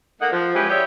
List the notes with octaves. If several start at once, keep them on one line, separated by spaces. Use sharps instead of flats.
A3 A#3 D#4 F#5
F3
G#3 C#4 E4 G4 B4
E4 G4 G#4 C#5 D5 E5